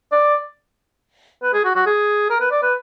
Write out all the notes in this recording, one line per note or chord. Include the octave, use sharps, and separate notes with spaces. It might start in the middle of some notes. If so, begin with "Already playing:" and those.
D5
B4
G#4
F#4
F#4
G#4
A#4
B4
D5
B4